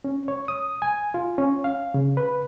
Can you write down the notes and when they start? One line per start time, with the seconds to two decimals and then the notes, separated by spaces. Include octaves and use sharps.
0.04 C#4
0.28 C#5
0.48 D#6
0.82 G#5
1.14 F4
1.38 C#4
1.64 F5
1.94 C#3
2.17 B4